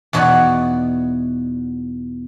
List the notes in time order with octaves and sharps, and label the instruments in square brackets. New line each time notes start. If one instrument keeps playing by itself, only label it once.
[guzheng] E2 B2 D#4 C#5 D5 F#5